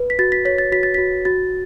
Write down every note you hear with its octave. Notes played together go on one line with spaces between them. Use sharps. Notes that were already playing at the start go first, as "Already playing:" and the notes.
Already playing: B4
B6
F#4 A6
B6
C#5 B6
A6
F#4 B6
A6
F#4 B6
F#4 A6